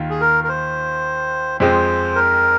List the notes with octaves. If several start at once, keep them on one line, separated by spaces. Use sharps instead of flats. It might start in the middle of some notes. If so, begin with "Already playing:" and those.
Already playing: D#2 D#3 F4
G#4
A#4
A#4
C5
F2 F3 G#3 C4 C5
A#4